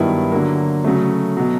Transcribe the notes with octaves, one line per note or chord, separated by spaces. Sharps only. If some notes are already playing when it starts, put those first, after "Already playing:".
Already playing: G2 D#3 F#3 B3 E4
D3 F#3 A#3
C#3 F#3 A3
B2 F#3